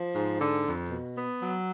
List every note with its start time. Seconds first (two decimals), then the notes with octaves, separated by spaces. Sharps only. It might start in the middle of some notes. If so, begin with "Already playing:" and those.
Already playing: F3
0.14 G#2
0.40 D3
0.65 F2
0.90 B2
1.14 B3
1.40 F#3